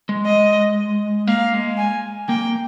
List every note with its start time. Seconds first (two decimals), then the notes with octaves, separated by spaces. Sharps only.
0.09 G#3
0.26 D#5
1.27 A#3 F5
1.54 G#3
1.78 G#5
2.29 A#3 G5